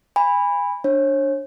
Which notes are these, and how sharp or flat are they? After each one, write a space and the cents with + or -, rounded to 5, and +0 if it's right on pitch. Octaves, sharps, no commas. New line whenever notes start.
G#5 -30 B5 +0
D4 +0 C#5 -35